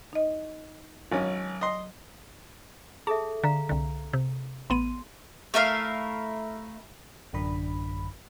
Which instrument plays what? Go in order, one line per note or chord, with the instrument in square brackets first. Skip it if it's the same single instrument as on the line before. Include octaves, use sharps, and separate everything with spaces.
[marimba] D#4 D#5
[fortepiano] G#1 C#4 [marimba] F#3
[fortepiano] D#5 C6
[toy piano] G#4 A4 E5 [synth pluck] A5
[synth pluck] D3 [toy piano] F5 A#5
[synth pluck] C2 D3
C3
[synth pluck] A1 B3 D#7 [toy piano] C6
[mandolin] A3 E4 A#4 F5
[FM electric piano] A1 F#2 D3 D4 B5